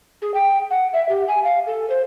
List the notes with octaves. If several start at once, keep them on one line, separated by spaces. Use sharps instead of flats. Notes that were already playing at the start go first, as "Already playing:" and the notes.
G#4
G5
F#5
E5
G4
G#5
F5
A4
C5